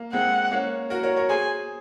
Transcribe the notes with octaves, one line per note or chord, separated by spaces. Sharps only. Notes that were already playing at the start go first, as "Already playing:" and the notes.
Already playing: A#3
G#3 C4 F#5
A#3 C#4
F#4 A#4
A#4 C#5
A#4 C#5
G#4 C5 G#5